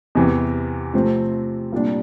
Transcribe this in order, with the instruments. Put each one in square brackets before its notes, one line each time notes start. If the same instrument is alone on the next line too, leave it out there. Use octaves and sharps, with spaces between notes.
[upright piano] E2 C3 E3
C3 F3 A3 C4
C2 A#2 G3 D4